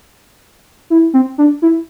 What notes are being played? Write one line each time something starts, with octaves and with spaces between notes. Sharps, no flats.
E4
C4
D4
E4